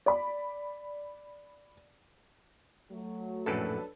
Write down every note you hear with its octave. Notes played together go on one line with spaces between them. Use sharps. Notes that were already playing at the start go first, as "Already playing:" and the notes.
D5 B5
F#3 A3
A#1 F#2 A2 D4 A4 B4 C#5